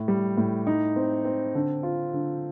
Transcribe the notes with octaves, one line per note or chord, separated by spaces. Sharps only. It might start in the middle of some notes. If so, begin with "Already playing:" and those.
Already playing: A2
G3
A2
D#4
C4
C4
D3
F4
D3